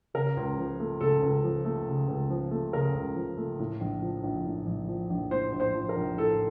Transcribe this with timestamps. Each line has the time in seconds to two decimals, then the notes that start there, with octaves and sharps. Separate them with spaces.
0.14 C#3 A#4
0.37 C#2
0.58 F3
0.80 A3
1.01 C#3 A4
1.23 C#2
1.44 F3
1.65 A3
1.87 C#3
2.08 C#2
2.30 F3
2.51 A3
2.73 C#3 A#4
2.94 C#2
3.16 F3
3.37 A3
3.59 A2
3.81 A#1
4.02 F3
4.24 A#1
4.45 A2
4.67 A#1
4.88 F3
5.10 A#1
5.31 A2 C5
5.53 A#1
5.60 C5
5.74 F3
5.89 A#4
5.96 A#1
6.17 A2 A4